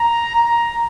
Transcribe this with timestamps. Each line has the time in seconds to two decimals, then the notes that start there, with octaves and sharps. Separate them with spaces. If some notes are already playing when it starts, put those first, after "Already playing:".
Already playing: A#5
0.35 A#5